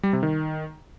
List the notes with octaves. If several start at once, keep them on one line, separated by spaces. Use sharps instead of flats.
G3
C3
D#3